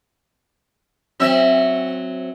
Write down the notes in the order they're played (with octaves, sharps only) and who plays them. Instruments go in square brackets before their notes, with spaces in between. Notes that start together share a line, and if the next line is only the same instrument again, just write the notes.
[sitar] F#3 C4 E5